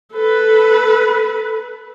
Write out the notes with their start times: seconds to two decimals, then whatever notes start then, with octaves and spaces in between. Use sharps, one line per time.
0.13 A4 B4